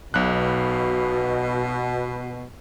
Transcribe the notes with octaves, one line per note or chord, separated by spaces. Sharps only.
B1 B2 F#6